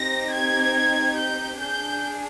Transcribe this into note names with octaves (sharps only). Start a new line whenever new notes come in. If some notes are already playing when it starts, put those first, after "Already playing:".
Already playing: C4 D#4 G4 A#6
G#6
G6
D4 G#4 G6